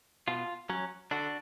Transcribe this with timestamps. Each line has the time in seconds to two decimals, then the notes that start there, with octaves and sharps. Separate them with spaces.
0.28 B2 F4
0.70 F#3 C#4
1.11 D3 D4 F#4